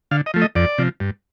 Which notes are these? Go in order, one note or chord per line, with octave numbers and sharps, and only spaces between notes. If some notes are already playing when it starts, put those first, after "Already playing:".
D3 F5
D#5
F3 A3
D#5
F2 D5
C3 F3
G2